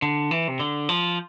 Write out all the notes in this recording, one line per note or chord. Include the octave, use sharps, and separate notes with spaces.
D3
E3
C3
D3
F3